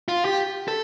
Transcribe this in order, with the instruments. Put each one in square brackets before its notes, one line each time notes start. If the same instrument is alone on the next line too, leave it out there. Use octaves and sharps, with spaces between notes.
[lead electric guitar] F4
G4
A4